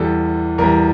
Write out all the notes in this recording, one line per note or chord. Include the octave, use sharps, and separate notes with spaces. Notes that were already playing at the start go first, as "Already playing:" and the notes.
Already playing: E2 E3 G3 A4
E2 E3 G3 A#4